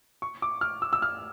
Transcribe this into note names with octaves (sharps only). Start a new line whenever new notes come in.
C#6
D6
F6
E6
E6
F6